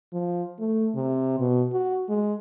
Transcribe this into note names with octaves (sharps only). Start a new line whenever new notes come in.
F3
A3
C3
B2
F#4
G#3